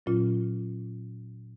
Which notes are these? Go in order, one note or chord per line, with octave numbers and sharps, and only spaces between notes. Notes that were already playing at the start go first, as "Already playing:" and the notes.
A#2 F#3 C#4 F4